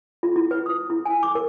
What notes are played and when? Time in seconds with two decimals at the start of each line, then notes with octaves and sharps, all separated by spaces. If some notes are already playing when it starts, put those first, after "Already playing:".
0.23 F4
0.36 E4
0.51 B4
0.66 D#6
0.90 E4
1.05 G#5
1.23 D6
1.35 A#4